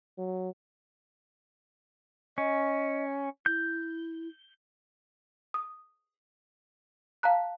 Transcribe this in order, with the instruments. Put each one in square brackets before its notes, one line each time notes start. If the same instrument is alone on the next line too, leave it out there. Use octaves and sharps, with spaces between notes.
[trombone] F#3
[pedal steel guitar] C#4 [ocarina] D#5
[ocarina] E4 [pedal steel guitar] G6
[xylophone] D#6
F5 A5 A#5 F#6